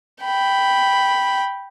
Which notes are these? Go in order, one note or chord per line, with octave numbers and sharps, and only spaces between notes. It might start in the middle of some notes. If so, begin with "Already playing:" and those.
G5 B5